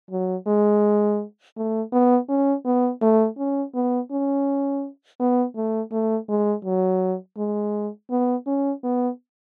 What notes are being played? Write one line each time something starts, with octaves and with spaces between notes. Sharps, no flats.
F#3
G#3
A3
B3
C#4
B3
A3
C#4
B3
C#4
B3
A3
A3
G#3
F#3
G#3
B3
C#4
B3